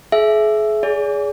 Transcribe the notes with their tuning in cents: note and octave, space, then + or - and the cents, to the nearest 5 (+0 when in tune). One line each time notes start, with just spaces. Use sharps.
G#4 +40 E5 +10
G#4 +0 D5 -45